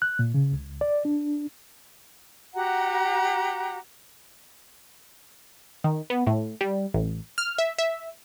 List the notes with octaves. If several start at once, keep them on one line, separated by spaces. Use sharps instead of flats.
F#6
A#2
C#3
C#2
D5
D4
F#4 G4 F#5 A#5
D#3
B3
A2
G3
A1
F6
E5
E5